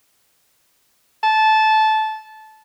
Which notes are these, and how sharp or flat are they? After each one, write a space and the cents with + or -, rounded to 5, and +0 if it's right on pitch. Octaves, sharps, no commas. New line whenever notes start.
A5 -15